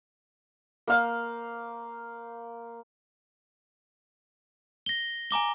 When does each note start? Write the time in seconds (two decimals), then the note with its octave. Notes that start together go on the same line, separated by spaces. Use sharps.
0.87 A#3 C5 F5
4.86 A#6 G7
5.31 G#5 A#5 D6 G7